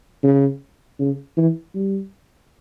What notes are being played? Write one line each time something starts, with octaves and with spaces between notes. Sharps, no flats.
C#3
C#3
E3
G3